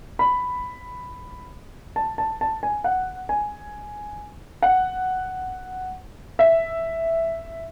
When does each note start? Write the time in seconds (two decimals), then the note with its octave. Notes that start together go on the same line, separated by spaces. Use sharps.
0.19 B5
1.96 A5
2.18 A5
2.41 A5
2.63 G#5
2.84 F#5
3.29 G#5
4.62 F#5
6.39 E5